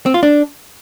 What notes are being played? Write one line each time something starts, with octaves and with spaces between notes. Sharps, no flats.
C4
F4
D4